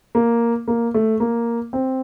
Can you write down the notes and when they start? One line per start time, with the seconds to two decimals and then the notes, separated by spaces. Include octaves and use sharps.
0.15 A#3
0.68 A#3
0.94 A3
1.20 A#3
1.73 C4